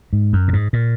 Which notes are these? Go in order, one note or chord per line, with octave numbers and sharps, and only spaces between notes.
G#2
F#2
A#2
G#2
A#2